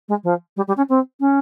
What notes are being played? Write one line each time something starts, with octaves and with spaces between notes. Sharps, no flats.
G#3
F3
G3
G3
C#4
C4
C#4